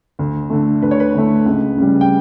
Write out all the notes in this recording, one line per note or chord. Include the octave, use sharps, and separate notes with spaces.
D2
D3 A3
D2 B4
C#5
B4
D3 A3
C#2
C#3 G3
G5